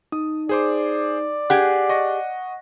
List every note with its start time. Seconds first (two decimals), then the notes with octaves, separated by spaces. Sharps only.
0.12 D#4 D#6
0.49 G#4 C5 D5 D6
1.50 G4 G#4 F#5 F#6
1.89 D#5 C#6 A#6